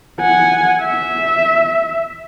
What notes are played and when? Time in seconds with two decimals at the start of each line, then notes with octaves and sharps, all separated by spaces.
0.21 F#5 G#5
0.82 E5